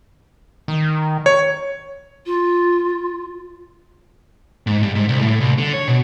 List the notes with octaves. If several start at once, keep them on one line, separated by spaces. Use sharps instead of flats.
D#3
C#5
F4
G#2
G2
G#2
C2
A2
C2
D3
C#5
B2